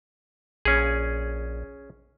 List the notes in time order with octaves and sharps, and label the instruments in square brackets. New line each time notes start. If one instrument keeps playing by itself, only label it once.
[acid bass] A#1 [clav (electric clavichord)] C#4 G#4